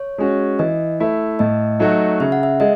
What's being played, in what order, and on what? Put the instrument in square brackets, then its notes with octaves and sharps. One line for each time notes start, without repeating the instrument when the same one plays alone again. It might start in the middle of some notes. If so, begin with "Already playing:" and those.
Already playing: [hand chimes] C#5
[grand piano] G#3 C#4 F#4
[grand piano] E3 [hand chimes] D#5
[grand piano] A3 E4
[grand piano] A2 [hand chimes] D#5
[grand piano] F#3 A3 D#4 F#4
[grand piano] C#3 [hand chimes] E5
[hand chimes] F#5
E5
[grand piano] G#3 [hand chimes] D#5